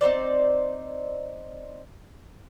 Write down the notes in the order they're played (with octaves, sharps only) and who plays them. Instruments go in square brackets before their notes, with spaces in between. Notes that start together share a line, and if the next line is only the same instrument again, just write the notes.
[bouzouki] C4 D#4 C5 D5